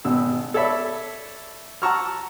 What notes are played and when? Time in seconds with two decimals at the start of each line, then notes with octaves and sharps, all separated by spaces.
0.05 G#1 B2 E6
0.54 A4 C#5 D5 E5 B5
1.82 F#5 A5 A#5 C#6 E6 F6